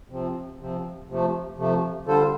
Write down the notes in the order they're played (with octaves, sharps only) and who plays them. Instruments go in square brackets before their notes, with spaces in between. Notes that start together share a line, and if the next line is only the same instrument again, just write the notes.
[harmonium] C3 F3 C4
C3 F3 C4
C3 F3 A3
C3 F3 A3
D3 G3 F4 A4 C5